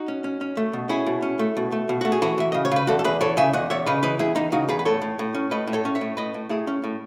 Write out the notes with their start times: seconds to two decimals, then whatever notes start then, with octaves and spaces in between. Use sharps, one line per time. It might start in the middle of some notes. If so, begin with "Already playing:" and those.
Already playing: D#4 F#4
0.08 C#4
0.24 C#4
0.41 C#4
0.57 A3
0.73 B2
0.89 C#4 E4 G#4
1.07 B2
1.22 C#4
1.39 A3
1.57 B2
1.72 A3
1.89 B2
2.01 A3 F#4
2.12 G#4
2.22 E3 F#4 A4
2.38 E3 E5
2.52 C#3 D#5
2.65 C#5
2.72 C#3 B4
2.87 E2 F#4 A4
2.99 A4
3.04 E2 G#4 B4
3.21 E3 A4 C#5
3.37 C#3 E5 G#5
3.53 E2 D#5 F#5
3.70 E2 C#5 E5
3.86 C#3 B4 D#5
4.03 E3 B4 D#5
4.19 E2 E4 G#4
4.36 E3 D#4
4.52 C#3 D#4 F#4
4.69 E2 G#4 B4
4.79 B4
4.85 A2 A4 C#5
5.02 A2
5.19 A2
5.34 C#4
5.51 A2 B4 D#5
5.67 A2
5.73 A4 C#5
5.85 C#4
5.95 C#5 E5
6.01 A2
6.17 A2 B4 D#5
6.34 A2
6.49 A2 E4 G#4
6.67 C#4
6.84 A2